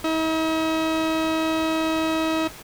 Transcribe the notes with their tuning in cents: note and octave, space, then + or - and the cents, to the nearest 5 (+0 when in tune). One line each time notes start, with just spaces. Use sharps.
D#4 +45